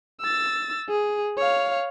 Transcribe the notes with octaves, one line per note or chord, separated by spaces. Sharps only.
E6 A6
G#4
C#5 F5